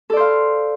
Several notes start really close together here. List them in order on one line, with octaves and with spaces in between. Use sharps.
A4 D5 C5 F5